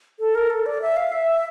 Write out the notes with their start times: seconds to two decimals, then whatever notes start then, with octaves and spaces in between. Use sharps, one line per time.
0.20 A4
0.35 A#4
0.50 A4
0.66 D5
0.82 E5
0.96 F5
1.12 E5